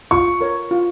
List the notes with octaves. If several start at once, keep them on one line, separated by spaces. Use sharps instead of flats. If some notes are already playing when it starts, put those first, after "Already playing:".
F4 C#6
A#4 C#5
F4